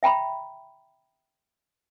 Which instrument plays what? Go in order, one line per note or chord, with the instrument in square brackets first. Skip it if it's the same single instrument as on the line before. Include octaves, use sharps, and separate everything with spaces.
[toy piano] E5 G5 A#5 B5